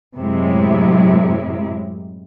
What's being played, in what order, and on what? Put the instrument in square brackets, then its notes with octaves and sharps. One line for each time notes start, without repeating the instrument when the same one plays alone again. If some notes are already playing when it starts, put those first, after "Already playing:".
[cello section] F#2 A2 C3 F#3 G#3 E4